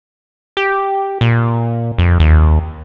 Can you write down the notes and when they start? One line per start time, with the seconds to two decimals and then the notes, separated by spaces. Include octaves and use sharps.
0.57 G4
1.21 A#2
1.98 F2
2.20 D#2